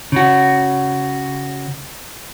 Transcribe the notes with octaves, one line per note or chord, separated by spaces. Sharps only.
C#3 F#4